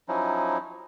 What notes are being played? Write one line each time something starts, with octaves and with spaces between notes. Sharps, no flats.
F3 F#3 C#4 D#4 E4